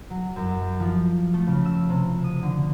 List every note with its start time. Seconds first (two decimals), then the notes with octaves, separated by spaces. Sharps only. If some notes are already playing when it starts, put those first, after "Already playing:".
0.10 F#3
0.36 F#2
0.80 F3
1.34 A3
1.47 C#3
1.65 E6
1.89 C3
2.24 D#6
2.42 D3